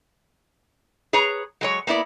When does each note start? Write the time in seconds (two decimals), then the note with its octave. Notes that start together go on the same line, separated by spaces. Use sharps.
1.13 G#4 B4 C#5 A#5
1.61 F#3 G#3 C#5
1.87 A#3 B3 E4 D5